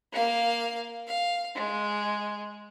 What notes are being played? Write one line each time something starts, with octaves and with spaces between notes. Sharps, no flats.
A#3 F5
F5
G#3